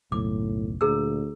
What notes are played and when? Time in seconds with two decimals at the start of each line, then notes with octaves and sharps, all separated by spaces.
0.12 F#1 B1 A2 D6
0.81 D2 A#2 G#4 A#5 E6